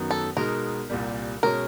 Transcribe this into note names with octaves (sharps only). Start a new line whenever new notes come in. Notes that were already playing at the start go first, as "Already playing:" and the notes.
Already playing: F#2 D#3 F#3 B3
A4
B2 G#3 B3 D#4 A#4
C2 A#2 G3
B2 G#3 C#4 A#4